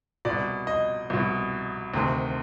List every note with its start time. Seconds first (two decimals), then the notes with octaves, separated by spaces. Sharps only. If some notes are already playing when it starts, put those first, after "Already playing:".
0.25 B2 D5
0.30 C2
0.67 D#5
1.10 C2 B2
1.94 D2 C3 D#3